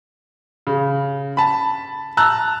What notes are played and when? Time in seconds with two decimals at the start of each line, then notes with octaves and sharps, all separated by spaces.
0.67 C#3
1.37 A5 B5
2.17 A5 A#5 E6 F#6